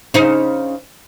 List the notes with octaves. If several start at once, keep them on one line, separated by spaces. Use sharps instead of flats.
C#3 D#4 C5